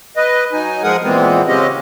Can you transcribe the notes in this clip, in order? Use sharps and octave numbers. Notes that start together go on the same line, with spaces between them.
B4 D#5
F#3 D#4 G#5
F3 G#3 G#4 A#4 F#5 D#6
A#2 E3 G#3 B3 C4
C#3 G#3 C4 C#4 G4 D#5